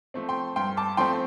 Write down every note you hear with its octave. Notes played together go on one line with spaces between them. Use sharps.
F3 A3 C4
G5 C6
G2 G5 C6
A5 D6
F3 A3 C4 G5 C6